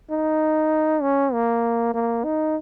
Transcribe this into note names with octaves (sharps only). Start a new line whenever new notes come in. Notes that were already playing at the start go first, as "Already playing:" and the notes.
D#4
C#4
A#3
A#3
D#4